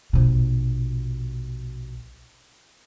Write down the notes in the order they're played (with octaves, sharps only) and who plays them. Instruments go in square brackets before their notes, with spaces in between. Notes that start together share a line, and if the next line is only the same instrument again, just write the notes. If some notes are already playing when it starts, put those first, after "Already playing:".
[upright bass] A#1 B2